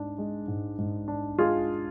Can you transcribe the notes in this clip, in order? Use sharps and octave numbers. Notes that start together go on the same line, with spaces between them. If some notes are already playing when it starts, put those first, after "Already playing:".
Already playing: G#2 D4
G#3
G#2
G#2
D4
G#3 F4 G#4